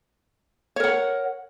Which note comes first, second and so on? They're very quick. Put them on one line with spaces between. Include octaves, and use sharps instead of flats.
C#5 A#4 F#5